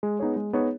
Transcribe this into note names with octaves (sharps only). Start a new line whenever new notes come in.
G#3
B3 D#4 G#4 C#5
G#3
B3 D#4 G#4 C#5